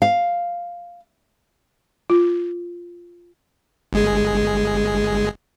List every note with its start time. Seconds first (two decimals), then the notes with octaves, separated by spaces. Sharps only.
0.02 F5
2.10 F4
3.93 G1 G#3 G#4